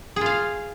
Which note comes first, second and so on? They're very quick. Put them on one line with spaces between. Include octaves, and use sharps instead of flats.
G#4 F4 F5